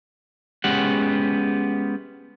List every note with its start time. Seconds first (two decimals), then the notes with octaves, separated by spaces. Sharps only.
0.64 G#3 B3 C#4 G4 F#5